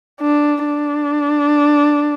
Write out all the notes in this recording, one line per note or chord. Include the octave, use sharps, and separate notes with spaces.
D4
D4